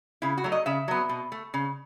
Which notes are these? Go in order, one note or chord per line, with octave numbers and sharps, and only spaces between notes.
C#3 E4
F#4
F#3 A3
D#5
C#3 E5
F#3 B3
B2
A3
C#3